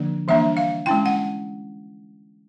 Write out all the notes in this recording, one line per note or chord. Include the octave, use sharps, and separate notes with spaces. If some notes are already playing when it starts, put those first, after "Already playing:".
Already playing: D3 F3 A#3 D4
E3 G3 A#3 D4 E5
F5
G#3 C#4 E4 G5
F#5